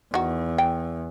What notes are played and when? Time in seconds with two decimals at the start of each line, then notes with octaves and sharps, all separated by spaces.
0.14 E2 D#3 F#4
0.58 G5